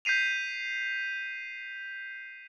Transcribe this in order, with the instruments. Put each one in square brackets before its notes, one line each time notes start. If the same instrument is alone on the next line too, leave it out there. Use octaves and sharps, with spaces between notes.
[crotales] G6 B6 C7 D#7 F7